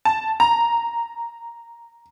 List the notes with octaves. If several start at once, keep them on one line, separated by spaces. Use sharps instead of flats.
A5
A#5